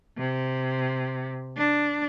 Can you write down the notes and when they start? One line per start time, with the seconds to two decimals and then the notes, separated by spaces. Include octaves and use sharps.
0.17 C3
1.57 D4